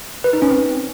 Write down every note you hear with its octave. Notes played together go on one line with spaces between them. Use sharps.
B4
D#4
C#4
C4